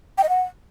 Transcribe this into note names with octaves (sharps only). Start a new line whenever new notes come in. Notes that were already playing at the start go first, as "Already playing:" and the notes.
G5
D#5
F#5